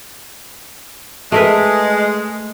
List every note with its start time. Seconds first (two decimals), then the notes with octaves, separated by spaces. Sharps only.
1.32 G#3 A3 A#4 B4